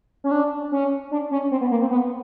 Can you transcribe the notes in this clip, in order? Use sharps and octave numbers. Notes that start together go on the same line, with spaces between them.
C#4
D4
C#4
D4
C#4
C4
B3
A#3
C4
B3